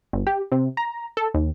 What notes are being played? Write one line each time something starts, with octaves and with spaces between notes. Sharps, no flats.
G1
G4
C3
A#5
A4
D#2